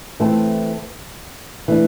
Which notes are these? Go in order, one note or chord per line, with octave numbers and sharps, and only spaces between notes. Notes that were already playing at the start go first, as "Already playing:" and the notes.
E3 A3 C4 E4 A4
E3 A3 D4